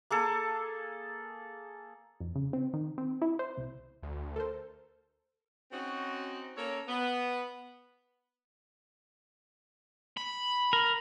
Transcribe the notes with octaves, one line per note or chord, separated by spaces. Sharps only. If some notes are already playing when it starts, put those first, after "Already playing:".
A#3 G#4 A4
F2
C#3
C4
D#3
C4
E4
C5
C2
D2
A4 A#4 C5
C4 C#4 D#4 F#4
A#3 C#4 A4 C#5
B3
B5
A#4